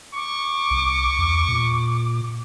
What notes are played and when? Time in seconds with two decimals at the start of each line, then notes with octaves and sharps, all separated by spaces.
0.15 C#6 D6
0.71 C2
1.19 E2
1.49 A#2